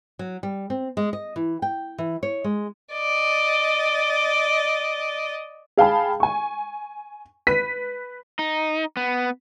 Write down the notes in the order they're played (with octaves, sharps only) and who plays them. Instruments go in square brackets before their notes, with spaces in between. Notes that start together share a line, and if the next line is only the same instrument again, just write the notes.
[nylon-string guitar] F#3
G3
C4
G#3
D#5
E3
G5
E3
C#5
G#3
[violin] D5 D#5
[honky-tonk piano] G#4 F5 G5 A5 B5
G#5 C#6
B4 B6 D#7
[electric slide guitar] D#4
B3